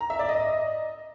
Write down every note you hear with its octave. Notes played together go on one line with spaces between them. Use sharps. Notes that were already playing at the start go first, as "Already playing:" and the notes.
A#5
E5
D5
D#5